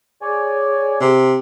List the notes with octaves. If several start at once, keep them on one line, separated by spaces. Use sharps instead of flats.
G#4 C#5 D5 G#5
C3